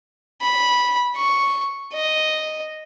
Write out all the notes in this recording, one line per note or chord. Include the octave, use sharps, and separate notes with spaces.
B5
C#6
D#5